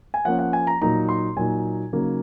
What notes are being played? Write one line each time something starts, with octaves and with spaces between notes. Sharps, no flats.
G#5
F3 A#3 C#4 F#5
F#5
G#5
A#5
A#2 F#3 A#3 D#4 A#5
C6
A#2 F#3 A#3 D#4 G#5
C#3 F#3 A#3 D#4